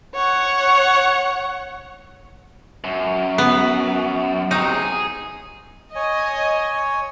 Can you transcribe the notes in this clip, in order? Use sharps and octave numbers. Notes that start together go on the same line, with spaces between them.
C#5 F#5
F#2
B3
C3 F#3 D#4
G#4
C#5 D#5 G#5